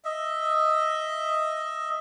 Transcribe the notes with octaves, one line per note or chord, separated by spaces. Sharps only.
D#5 E5